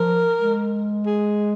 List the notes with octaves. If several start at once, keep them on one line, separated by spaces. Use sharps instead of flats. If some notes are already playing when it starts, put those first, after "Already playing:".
Already playing: F3 A#4
G#3
G#4